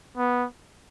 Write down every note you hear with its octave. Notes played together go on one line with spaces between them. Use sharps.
B3